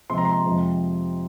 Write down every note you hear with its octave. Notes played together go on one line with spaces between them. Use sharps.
C3 F3 G#3 C6
A#5
C6
F2 C3 F3 G#3